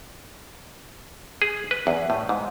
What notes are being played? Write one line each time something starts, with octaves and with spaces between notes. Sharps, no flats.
G#4
B4
E2
A2
G#2